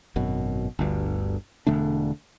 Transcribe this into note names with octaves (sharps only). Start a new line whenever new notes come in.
G#1 F#2 B2
G1 D2 G2
E1 D3 A3 D4